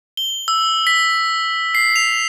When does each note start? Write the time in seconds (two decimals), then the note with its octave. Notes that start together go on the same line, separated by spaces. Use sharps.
0.17 G7
0.48 E6
0.87 B6
1.75 C7
1.96 F7